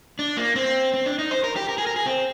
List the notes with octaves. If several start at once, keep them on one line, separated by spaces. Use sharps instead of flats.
D4
A#3
C4
C4
D4
D#4
C5
A#4
G4
A#4
G#4
A#4
G#4
C4